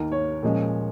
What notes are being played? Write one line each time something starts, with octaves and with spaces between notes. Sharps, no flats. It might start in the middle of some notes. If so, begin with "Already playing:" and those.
Already playing: D#2 D#3 A#3 A#4
C#5
A#2 F3 G#3 C#4